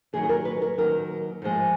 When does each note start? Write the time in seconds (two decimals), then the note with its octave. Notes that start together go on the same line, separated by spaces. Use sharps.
0.13 F#2 D#3 F#3 G#4
0.23 G#4
0.29 A#4
0.45 B4
0.62 A#4
0.78 D#2 D#3 F#3 A#4
1.42 G#2 F3 G#3